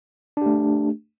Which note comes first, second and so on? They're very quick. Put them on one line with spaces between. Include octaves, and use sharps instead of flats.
D4 G4 A3